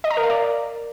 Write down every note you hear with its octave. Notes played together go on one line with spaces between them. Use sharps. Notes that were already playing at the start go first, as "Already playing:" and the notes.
D#5
A#5
A#4
F5
D5